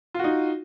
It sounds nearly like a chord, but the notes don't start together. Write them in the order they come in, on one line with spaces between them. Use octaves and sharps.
F4 F#4 D#4